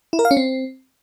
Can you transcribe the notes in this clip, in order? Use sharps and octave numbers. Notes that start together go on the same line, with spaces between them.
E4
A#4
F5
C#4
C4